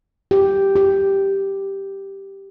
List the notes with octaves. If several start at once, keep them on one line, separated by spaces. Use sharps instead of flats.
G4
G4